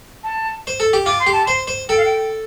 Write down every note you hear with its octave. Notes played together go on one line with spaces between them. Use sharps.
A5
C5
A4
G4
F4 D6
C6
G4
A5
C5 C6
C5
A4 G5
F5
G5